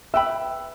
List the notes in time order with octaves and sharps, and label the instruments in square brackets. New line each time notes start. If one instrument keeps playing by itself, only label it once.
[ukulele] B4 G5 B5 [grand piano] E5 E6